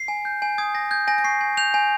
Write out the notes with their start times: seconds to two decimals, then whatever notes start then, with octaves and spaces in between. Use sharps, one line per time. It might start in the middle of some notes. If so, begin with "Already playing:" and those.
Already playing: C7
0.08 G#5
0.25 G6
0.42 G#5
0.58 D#6 G#6
0.75 G#5 A#6
0.91 G6 G#6
1.08 G#5 A#6
1.18 A#6
1.24 C#6 C7
1.41 G#5
1.57 G6 F7
1.74 G#5